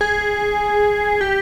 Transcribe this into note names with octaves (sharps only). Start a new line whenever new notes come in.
G#4
G4